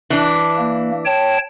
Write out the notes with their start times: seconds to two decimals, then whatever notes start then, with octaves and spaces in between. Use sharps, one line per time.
0.10 E3 D4
0.58 A#3
1.05 C#5 G5 A5